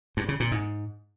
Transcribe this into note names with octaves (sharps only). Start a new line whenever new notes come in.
G2
C#3
A#2
G#2